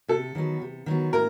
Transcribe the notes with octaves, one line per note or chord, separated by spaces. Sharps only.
C3 A4
D#3 F#3 B3
C3
D#3 F#3 B3
A2 A#4